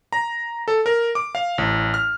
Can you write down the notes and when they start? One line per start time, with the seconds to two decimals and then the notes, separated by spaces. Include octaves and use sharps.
0.13 A#5
0.68 A4
0.86 A#4
1.15 D6
1.35 F5
1.58 A1
1.94 F6